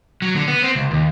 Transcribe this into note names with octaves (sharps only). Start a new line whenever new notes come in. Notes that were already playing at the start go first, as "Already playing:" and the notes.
F#3
D3
B3
C4
C#2
D#2